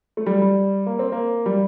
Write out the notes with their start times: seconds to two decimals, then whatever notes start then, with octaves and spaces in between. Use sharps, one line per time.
0.17 A3
0.26 G3
0.42 G3
0.86 A#3
0.99 C4
1.12 A#3
1.46 G3